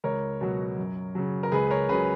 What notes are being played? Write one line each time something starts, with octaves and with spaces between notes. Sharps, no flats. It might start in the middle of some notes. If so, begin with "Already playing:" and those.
C#2 A#4 C#5
B2 F#3
F#2
C#3 F#3
A#4
C#2 G#4 B4
B4
A#4 C#5
C#3 F#3 G#4 B4